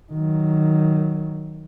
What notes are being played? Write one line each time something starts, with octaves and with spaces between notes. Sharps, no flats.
D#3 F#3